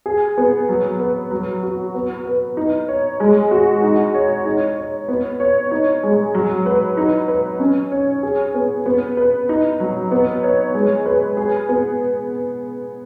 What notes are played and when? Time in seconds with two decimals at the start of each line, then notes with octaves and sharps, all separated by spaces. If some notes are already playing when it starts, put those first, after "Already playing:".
0.06 G#4
0.37 B3
0.69 F#3
1.00 B4
1.31 F#3
1.63 F#4
1.95 B3
2.26 B4
2.57 D#4
2.88 C#5
3.20 G#3
3.51 F#4
3.83 D#4
4.14 C#5
4.46 D#4
4.77 C#5
5.08 B3
5.40 C#5
5.71 D#4
6.03 G#3
6.35 F#3
6.66 B4
6.97 D#4
7.28 B4
7.60 C#4
7.92 C#5
8.23 G#4
8.54 B3
8.86 B3
9.17 B4
9.49 D#4
9.80 F#3
10.11 B3
10.43 C#5
10.74 G#3
11.06 B4
11.37 G#4
11.69 B3